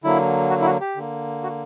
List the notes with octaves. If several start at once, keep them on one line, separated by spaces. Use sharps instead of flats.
D3 F#3 A#3 E4
F#4
E4
F#4
G4
D3 A#3
F#4